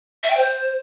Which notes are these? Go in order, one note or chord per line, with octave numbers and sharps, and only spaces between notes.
E5
G5
C5